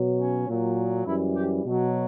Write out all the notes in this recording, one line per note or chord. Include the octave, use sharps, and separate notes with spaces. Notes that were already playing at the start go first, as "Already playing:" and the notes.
Already playing: B2 F#3
C#4
A#2 F#3
F#2 E3 G3 E4
G4
B2 F#3